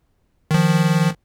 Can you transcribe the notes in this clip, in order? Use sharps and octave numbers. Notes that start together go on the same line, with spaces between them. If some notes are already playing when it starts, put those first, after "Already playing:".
D#3 F3